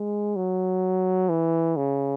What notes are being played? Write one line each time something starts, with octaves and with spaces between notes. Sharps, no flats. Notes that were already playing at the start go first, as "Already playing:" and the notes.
Already playing: G#3
F#3
E3
C#3